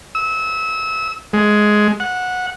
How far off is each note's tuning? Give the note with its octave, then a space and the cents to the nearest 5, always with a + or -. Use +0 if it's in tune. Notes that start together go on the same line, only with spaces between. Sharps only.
E6 -30
G#3 +10
F#5 -15